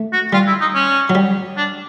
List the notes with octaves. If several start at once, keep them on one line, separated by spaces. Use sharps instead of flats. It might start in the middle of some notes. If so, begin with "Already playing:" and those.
Already playing: A3
F#4
G3 F4
E4
D#4
C#4
F#3
G3
D4